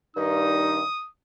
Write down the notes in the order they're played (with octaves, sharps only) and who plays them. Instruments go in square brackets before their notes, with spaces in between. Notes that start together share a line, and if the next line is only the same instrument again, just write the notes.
[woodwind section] G2 D#3 D#4 [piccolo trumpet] D#6